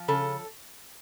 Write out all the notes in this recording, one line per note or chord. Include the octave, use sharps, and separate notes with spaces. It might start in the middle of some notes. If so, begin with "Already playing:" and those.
Already playing: F3
C#3 A4